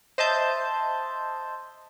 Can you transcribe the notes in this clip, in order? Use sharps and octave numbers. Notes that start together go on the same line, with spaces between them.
C5 D#5 E5 A5 G6